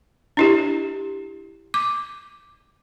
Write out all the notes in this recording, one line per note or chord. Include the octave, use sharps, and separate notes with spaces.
D4 E4 G4
D6